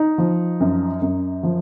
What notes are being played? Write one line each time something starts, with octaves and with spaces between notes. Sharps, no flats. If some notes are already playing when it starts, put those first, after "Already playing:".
Already playing: D#4
F3
F#2
F#2
F3